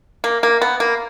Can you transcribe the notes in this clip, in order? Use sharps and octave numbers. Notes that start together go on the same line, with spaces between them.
A#3
A#3
B3
A#3